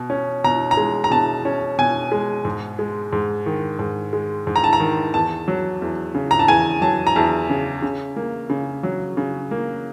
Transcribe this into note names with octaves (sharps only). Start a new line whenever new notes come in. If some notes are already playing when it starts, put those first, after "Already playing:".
Already playing: B2
C#4
B2 A#5
A#5
G#3
A#5
B2 A5
C#4
B2 G#5
G#3
G#2
G#3
G#2
D#3
G#2
G#3
G#2
A#5
A5
A#5
D#3
E2 A5
F#3
E2
C#3
A#5
A5
E2 G#5
F#3 A5
A#5
E2 A5
C#3
C#3
A#3
C#3
F#3
C#3
A#3